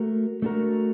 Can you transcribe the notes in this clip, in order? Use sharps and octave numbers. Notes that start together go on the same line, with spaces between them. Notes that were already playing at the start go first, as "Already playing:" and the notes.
Already playing: A3 F#4 A#4
A3 D4 F#4 A#4